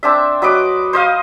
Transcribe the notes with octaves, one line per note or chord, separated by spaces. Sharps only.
C4 D4 E5
F#3 B4 D#5 D6
C5 D#5 F5